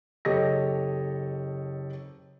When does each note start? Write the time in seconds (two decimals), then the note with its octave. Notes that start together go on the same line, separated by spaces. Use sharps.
0.25 F#1 G4 A4 C#5 D#5 A#6